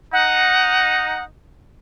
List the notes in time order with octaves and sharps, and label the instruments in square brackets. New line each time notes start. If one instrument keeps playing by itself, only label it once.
[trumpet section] D#4 [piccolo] F#5